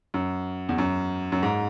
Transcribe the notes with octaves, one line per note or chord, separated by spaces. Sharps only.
F#2
E2
F#2
F#2
G#2